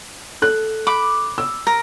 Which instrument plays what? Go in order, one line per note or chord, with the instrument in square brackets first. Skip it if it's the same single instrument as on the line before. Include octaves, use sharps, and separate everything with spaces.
[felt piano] A4 F#6
[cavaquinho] B5 D6
[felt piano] E6
[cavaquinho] A#4